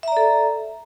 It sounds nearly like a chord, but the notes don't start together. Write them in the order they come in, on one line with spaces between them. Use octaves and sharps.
E5 A#5 D5 A4